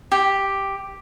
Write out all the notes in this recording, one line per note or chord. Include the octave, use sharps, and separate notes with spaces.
G4